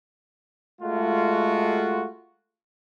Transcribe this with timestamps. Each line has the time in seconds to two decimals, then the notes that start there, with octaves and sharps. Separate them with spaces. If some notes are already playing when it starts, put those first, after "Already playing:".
0.82 G#3 A3 F4 F#4